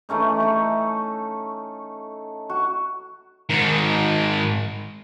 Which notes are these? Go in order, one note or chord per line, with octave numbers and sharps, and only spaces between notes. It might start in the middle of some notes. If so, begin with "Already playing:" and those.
E3 A3 C#4 D#4
D#4 A4
F#4
G#2 D#3